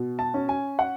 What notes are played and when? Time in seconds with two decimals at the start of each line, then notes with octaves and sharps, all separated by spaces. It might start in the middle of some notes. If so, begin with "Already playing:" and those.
Already playing: B2
0.19 A5
0.34 C#4
0.49 G#5
0.79 F#5